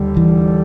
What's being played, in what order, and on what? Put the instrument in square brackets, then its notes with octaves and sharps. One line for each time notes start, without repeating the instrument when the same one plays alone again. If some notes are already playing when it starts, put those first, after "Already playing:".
Already playing: [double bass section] D#2 D3 G3
[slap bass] E3